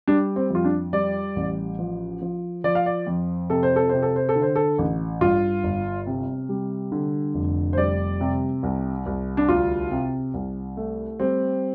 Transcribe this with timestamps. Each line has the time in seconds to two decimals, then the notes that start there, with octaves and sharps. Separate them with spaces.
0.07 G3 D4
0.36 C4
0.50 F2 F4
0.64 D4
0.93 G3 D5
1.36 A1
1.79 F3
2.22 F3
2.64 F3 D5
2.75 F5
2.86 D5
3.07 F2
3.50 C3 A4
3.63 C5
3.76 A4
3.89 C3 C5
4.02 A4
4.16 C5
4.29 A4
4.36 D3
4.42 C5
4.56 A4
4.78 A1
5.21 G2 F4
5.64 G1
6.06 C3
6.49 G3
6.92 D3
7.35 F1
7.73 C5
7.78 G3 D5
8.21 C3
8.63 C2
9.06 C2
9.37 D4
9.49 D2 F4
9.91 C3
10.34 C2
10.77 A3
11.20 G3 C4